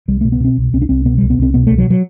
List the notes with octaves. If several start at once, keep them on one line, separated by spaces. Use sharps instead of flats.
C2 G3
B2 A3
B3
B2 C4
C2
C2 C4
D4
C2 C4
B2 B3
C2 G3
B3
C2 C4
B2 B3
C2 A3
F#3
F#3